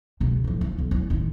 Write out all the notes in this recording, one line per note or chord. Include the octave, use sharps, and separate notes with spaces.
C#2 B2
A2 F3
D#3 F3
B1 F#3
E2
A1 D#3